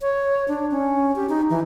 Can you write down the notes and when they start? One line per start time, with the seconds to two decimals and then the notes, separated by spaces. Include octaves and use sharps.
0.01 C#5
0.48 D4
0.71 C#4
1.16 G4
1.29 D#4
1.50 E3